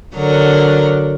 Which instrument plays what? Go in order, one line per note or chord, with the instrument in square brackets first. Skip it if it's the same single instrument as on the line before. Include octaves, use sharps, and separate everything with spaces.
[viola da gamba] D3 F#3 A#4